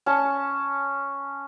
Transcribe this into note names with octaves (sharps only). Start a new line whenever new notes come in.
C#4 A5 C#6